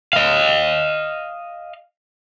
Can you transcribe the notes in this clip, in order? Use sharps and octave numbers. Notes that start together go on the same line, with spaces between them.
D#5 F5